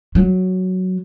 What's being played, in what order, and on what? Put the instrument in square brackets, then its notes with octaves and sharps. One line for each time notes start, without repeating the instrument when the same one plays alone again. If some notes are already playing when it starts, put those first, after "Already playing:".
[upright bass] F#3